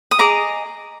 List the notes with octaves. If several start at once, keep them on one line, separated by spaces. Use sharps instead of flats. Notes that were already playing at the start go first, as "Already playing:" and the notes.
D#6
G#4 D#5 A#5 D6